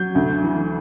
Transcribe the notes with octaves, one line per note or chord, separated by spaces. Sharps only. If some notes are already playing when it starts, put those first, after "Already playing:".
Already playing: F#3 G6
D2
E3